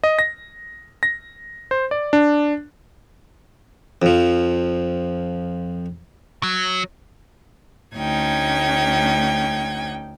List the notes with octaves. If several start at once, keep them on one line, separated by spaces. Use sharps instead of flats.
D#5
A#6
A#6
C5
D5
D4
F2 F3
F#3
D2 A3 C#4 D#4 G5 G#6